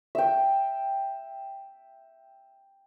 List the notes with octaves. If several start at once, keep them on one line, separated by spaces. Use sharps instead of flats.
E5 G5